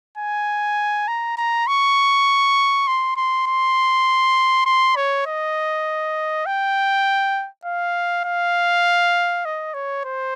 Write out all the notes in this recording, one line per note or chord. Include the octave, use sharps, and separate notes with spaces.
G#5
A#5
A#5
C#6
C6
C6
C6
C6
C#5
D#5
G5
F5
F5
D#5
C#5
C5